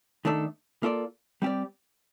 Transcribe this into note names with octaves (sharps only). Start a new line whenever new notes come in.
D#3 A3 D4 A4
A#3 F4 A4 D5
G3 C4 G4 D5